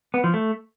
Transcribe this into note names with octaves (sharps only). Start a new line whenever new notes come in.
B3
F3
A3